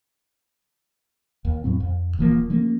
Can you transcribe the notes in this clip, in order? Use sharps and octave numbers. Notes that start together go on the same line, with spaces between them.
D#2
F2 A2 F#3 C4
F2
D#1 E3 F3 A#3
F3 A3 A#3 C#4